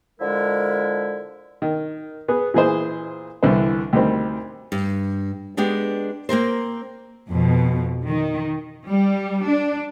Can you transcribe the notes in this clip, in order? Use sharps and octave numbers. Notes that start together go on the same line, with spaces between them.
D3 F3 G#3 E4 A#4
D#3
B3 G#4
A#2 E3 G#4 C5
C2 D3 E3 C5
D2 D#3 G3 C4
G2
G#3 B3 D4 G4
A#3 C4 A#4 C5
F2 B2
D#3
G3
D4